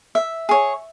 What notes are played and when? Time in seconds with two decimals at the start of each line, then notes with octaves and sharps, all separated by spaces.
0.15 E5
0.49 G#4 C#5